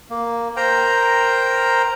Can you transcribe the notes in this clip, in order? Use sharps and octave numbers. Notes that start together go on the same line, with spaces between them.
A#3
A#4 C5 G5 A#5